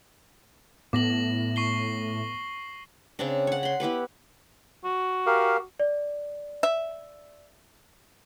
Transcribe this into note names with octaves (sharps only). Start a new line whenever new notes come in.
A2 B3 D6 A#6 F#7
C#6 C7 G7
C#3 C4 D4
C#5 F#5
B5 C6
B3 E4 G4 B4
F#4
G4 A#4 F5
D5
E5